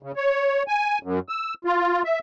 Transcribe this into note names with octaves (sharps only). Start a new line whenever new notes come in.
C#3
C#5
G#5
F#2
E6
F4
E5